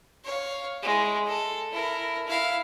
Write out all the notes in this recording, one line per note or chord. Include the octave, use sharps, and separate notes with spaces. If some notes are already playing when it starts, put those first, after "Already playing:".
C#5 F5
G#3 E4
A4
E4 A#4
E4 F5